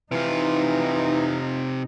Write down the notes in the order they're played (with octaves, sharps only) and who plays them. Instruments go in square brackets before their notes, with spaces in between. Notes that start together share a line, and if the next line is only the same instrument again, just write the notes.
[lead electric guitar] C3 F4 [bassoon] E3 [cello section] D#4